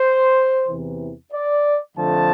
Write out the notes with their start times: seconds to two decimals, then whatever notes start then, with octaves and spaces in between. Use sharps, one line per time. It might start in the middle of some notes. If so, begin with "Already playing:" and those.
Already playing: C5
0.68 E2 C3 E3
1.33 D5
1.97 F2 D3 F3 A3 A5